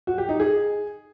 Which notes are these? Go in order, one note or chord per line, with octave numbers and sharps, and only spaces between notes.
F#4
G4
D#4
G#4